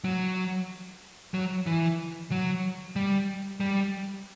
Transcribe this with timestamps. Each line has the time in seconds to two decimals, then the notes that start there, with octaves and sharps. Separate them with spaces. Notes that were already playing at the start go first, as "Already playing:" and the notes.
0.05 F#3
1.34 F#3
1.67 E3
2.31 F#3
2.96 G3
3.60 G3